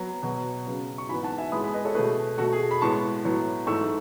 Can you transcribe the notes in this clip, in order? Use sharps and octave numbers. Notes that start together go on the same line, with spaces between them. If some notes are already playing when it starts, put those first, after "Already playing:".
Already playing: F#3 B3
B2 F#3 B3
C#3 F#3 B3
C#6
G#2 E3 B3 G#5 B5
F#5 A5
E5 G#5
A2 G#3 B3 B5 D#6
G#5 B5
B4 D#5
A4 C#5
B2 A3 G#4 B4
B2 A3 F#4 A4
G#4
B5
A2 G#3 B3 A5 C#6
A2 F#3 B3
G#2 E3 A3 C#6 E6